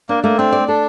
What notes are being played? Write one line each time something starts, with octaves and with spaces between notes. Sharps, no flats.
A#3 D4
A3 A#3
C4 D4
D5
D4 A4